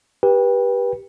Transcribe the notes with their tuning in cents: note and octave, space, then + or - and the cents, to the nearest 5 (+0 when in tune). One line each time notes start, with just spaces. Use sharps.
G4 +0 B4 -25 G5 +25